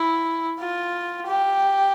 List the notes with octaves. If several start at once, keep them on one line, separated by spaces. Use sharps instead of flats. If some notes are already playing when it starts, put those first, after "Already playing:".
Already playing: E4
F4
G4